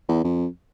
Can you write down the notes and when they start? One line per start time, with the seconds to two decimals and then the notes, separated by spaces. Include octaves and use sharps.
0.09 E2
0.24 F2